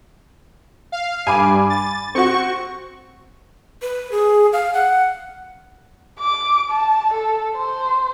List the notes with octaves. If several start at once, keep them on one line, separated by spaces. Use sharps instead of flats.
F5
G2 G#5 B5 D6
A6
C4 F#4 C#6
B4
G#4
F5
F#5
D6
A5
A4
C5